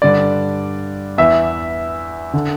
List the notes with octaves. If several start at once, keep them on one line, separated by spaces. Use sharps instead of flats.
G2 D3 D5
E2 E3 E5
D3